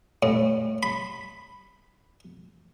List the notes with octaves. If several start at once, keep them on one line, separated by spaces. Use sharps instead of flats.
A2
B5